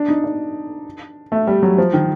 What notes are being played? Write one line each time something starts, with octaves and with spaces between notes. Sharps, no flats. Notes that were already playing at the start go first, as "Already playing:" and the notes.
Already playing: D4
D#4
D4
A3
G3
F#3
F3
D#3